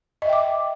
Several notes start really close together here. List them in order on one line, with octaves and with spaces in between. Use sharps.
D#5 E5 G5 D6